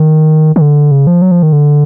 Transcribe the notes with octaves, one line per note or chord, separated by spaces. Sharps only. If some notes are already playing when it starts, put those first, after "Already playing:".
Already playing: D#3
D#3
D3
C#3
F3
F#3
F3
D#3
D3